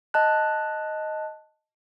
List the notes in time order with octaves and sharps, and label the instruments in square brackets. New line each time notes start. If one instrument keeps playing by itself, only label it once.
[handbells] D#5 A5 F#6